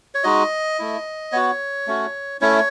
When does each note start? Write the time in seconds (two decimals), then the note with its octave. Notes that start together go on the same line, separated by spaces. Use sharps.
0.15 C#5
0.24 G#3 D#4 F#4 D#5
0.79 A3 E4
1.32 B3 F#4 C#5
1.87 A3 C#4 F#4
2.41 A3 C#4 E4 C#5